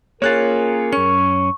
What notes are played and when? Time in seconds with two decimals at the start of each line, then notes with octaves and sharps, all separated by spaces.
0.22 A#3 C#4 F4 G#4 A#4 C#5 F#6 A6
0.93 F#2 C#4 C#6